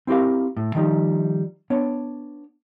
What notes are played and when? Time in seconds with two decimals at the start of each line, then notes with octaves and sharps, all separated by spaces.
0.07 C4 E4 G4 A#4 F5
0.57 A2
0.75 D#3 F3 G3 D#4
1.70 B3 D4 C#5